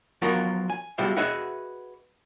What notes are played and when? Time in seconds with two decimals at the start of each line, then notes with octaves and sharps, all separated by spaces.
0.22 F3 F#3 B3 F4 F#4 A#4
0.70 G#5
0.98 B2 G3 G#3 F4 E5
1.17 F#4 G#4 B4 D#5 E5